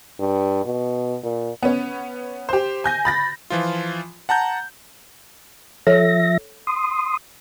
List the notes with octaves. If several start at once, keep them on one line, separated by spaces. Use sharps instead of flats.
G2
B2
A#2
B3 C#4
G4 C5
G#5 G6 A#6
B5 A6 A#6
E3 F3 F4
F#5 A5 A#5 G6
F3 A4 C#5 E5 A#6
C6 D#6